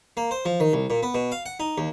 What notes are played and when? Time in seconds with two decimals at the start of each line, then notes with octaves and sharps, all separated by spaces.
0.17 A#3
0.31 C5
0.45 F3
0.60 D#3
0.73 C2
0.90 A#2
1.03 B3
1.14 B2
1.32 F5
1.46 F#5
1.60 D#4
1.78 D#2